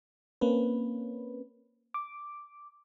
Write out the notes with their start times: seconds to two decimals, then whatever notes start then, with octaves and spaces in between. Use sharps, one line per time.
0.41 A#3 C4 C#4 B4
1.94 D6